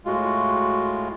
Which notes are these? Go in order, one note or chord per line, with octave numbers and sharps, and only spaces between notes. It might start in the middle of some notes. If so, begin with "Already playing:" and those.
A2 G#3 F4 F#4